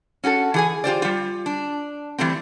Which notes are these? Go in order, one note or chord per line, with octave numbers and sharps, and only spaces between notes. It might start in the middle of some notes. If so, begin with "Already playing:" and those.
C#4 F#4 G4 A4
E3 G#4 G#5
F4 G4 C5 D5
G3 F4
D4
E3 G3 A3 C4